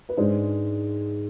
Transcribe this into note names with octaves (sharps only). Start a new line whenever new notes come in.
B4
G#2 G#3 D4 C5